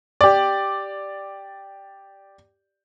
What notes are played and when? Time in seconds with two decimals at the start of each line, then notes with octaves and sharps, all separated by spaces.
0.21 G4 D5